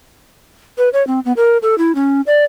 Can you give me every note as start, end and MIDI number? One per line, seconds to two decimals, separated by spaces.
0.78 0.89 71
0.93 1.05 73
1.07 1.20 60
1.25 1.32 59
1.37 1.57 70
1.62 1.78 69
1.78 1.95 64
1.95 2.21 61
2.27 2.44 74